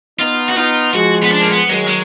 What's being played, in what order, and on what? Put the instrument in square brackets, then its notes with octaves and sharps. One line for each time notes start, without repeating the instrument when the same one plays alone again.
[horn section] B3 D#4 [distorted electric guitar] F4
[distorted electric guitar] F#4
[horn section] B3 D#4 [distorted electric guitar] F4
[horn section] F3 G#3 [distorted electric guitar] F#4
[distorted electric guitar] B3
D4
A#3
B3
[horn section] D#3 F#3 [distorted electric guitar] G#3
[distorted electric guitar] G#3